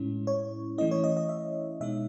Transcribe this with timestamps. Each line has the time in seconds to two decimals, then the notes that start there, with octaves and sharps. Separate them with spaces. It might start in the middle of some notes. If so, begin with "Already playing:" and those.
Already playing: A2 G#3 C#4 E4
0.27 C#5
0.78 E3 A3 C#4 E4 D#5
0.91 C#5
1.04 D#5
1.17 D#5
1.29 E5
1.81 B2 G#3 D#4 E5